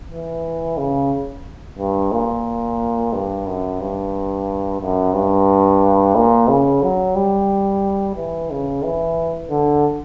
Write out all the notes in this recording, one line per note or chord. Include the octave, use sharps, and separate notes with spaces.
E3
C#3
G2
A#2
G2
F#2
G2
F#2
G2
A#2
C#3
F#3
G3
E3
C#3
E3
D3